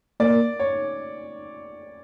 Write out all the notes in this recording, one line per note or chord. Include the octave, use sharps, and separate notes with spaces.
A#3 D5
C#5